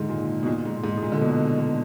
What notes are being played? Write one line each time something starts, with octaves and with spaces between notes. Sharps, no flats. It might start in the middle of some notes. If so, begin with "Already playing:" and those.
Already playing: G#2 D3 D#3
A#2
B2
A#2
G#2
G#2
G#2
A#2
D3
B2
D3